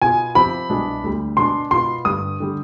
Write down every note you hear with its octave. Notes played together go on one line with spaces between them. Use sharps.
B2 B3 F4 G#4 G#5
C3 F3 C4 G4 B5
C2 B2 G#3 D4
D2 D3 G3
B2 G#3 D4 C6
B2 B3 F4 C6
G2 D3 G3 D#6
D3 G3